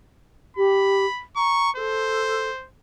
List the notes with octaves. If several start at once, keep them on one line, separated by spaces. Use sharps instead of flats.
G4 B5
A#5 C#6
A4 C5